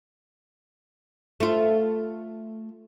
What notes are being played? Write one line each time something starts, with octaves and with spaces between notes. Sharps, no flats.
A3 F4